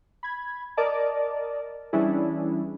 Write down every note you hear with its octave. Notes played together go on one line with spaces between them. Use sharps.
B5 G#6
A#4 D5 D#5 A5
E3 G3 C#4 D4 E4 G#4